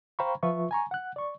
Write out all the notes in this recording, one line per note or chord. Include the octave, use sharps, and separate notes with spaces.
C5 F5 G5 A#5 B5 C#6
F3 F4 B4 E5 C#6
G#5 A#5 C#6
F#5 F#6
D5 C#6